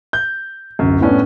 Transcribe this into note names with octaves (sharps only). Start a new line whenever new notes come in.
G6
D1 F#2
A2 B3 C#4 D4